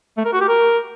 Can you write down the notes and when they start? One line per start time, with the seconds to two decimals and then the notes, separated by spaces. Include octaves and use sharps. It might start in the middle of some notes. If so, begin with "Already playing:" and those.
0.17 A3
0.25 A#4
0.33 F#4
0.41 G4
0.48 A#4